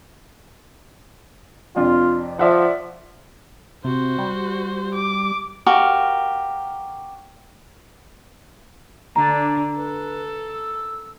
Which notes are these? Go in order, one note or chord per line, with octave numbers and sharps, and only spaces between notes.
F2 C3 D4 F4
F3 D5 E5 F#5
C3 F#4 C5
G3
D6
F#4 G4 A#4 F5
D3 D4 A#5
A4 B4
E6